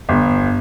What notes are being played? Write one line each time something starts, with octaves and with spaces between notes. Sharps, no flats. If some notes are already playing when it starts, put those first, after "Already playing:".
G1